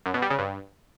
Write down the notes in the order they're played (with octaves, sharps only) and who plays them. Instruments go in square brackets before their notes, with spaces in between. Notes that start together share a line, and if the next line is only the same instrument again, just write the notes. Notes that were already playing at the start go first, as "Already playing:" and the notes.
[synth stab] F#2
B2
G3
C#3
G2